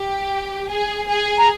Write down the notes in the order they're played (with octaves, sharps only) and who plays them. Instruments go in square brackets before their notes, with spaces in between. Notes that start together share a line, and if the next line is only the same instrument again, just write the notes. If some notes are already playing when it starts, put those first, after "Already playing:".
Already playing: [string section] G4
G#4
G#4
[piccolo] A#5